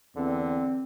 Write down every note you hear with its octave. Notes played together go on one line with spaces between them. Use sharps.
E2 D3 C4